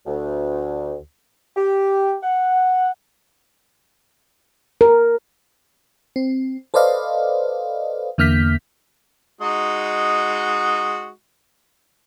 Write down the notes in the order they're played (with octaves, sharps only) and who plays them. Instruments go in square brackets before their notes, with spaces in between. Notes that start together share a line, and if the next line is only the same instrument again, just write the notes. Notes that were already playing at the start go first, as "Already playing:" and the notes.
[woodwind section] D2
G4
F#5
[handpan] A#4
[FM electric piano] C4
A4 B4 C5 D5 D#5 F5
E2 D3 A#3 F6 G6 B6
[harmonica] G#3 D#4 F#4